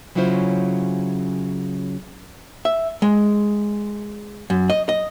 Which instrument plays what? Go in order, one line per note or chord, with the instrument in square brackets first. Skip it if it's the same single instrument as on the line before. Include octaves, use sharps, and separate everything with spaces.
[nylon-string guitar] C#3 F#3 C#4 E4 F4 C5
[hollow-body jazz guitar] E5
G#3
F#2
D#5
D#5